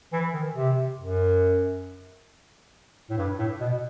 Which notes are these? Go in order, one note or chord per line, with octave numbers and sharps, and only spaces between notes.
E3
D#3
C3
F#2
A2
G2
A2
B2